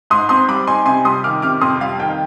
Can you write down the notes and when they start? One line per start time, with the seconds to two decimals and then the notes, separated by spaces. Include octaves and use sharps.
0.10 G#2 C6 D#6
0.29 C4 C6 D#6
0.49 G3 B5 D6
0.67 D#4 G#5 C6
0.86 C3 G#5 C6
1.05 G3 C6 D#6
1.24 D#3 D6 F6
1.42 C3 D6 F6
1.61 F2 C6 D#6
1.80 G3 F5
2.00 D#3 G5